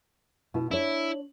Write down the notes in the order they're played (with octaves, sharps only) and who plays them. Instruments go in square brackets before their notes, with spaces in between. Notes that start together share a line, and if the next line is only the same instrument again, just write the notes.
[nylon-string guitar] B2 E4
[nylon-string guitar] D4 C#5 [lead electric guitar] E4